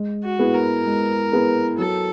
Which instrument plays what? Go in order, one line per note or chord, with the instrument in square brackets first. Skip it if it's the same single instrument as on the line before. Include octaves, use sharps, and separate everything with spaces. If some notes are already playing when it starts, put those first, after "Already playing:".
Already playing: [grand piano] G#3
[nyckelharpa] F#4
[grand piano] B3 E4 G#4 B4
[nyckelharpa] A#4
[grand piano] G#3
B3 E4 G#4 B4
[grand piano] F#3 [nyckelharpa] A4